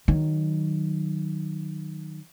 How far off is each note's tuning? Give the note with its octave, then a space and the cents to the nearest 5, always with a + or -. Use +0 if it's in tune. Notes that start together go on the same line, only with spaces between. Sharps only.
D#3 -10 F#3 +0